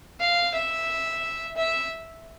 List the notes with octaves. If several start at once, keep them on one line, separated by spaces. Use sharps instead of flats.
F5
E5
E5